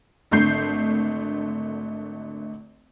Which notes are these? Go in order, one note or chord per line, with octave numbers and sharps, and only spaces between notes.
G#1 D3 A3 G6 C7